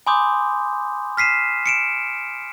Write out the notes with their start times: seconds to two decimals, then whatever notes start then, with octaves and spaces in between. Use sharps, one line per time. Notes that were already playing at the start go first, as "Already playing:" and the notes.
0.07 G#5 B5 C6 D6 D#6 G6
1.17 F6 B6 C7 D#7 E7
1.66 C#7 D7 E7